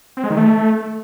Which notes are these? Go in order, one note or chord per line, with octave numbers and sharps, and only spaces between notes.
C4
G#3
D#3
A3